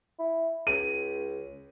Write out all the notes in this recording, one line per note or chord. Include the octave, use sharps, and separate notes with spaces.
E4
C#2 D#7